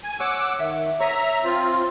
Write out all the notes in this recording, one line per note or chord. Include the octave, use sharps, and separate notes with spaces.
G#5
C#5 F#5 D6 E6
D#3 E5 F#5
C#5 E5 A#5 D#6
C4 F4